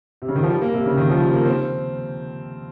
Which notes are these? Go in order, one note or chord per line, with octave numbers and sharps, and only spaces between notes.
C3
C#3
D#3
F3
G3
A#3
C3
C#3
D#3
F3
G3
A#3
C4